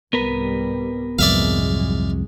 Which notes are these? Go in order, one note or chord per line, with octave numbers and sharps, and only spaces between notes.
C2 G#2 G3 B3 A#4 B4
C2 F2 G#2 F#3 G#3 D5 E5 F5